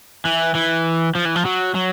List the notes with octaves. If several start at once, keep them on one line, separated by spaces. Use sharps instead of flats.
E3
E3
F3
E3
F3
F#3
F#3